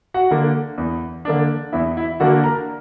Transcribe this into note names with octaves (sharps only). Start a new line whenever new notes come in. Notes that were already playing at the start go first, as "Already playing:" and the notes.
F#4 F#5
D3 A#3 D4
E2
D3 A#3 D4
E2 E4 E5
E4 E5
D3 A#3 D4 F#4 F#5
A#4 A#5